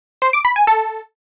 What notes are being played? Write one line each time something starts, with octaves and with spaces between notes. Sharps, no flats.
C5
D6
B5
G#5
A4